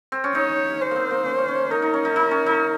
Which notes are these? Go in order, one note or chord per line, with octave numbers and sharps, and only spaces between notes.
C4
C#4
D#4 C#5
C#4 C5
A#3 C4
A#3
C#4
C#4
C#4
D#4 A#4
D#4
C#4
D#4
D#4
C#4
D#4